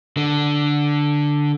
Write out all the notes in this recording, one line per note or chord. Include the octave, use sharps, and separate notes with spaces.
D3